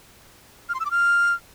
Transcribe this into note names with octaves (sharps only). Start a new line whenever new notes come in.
F6
C6
E6
D6
F6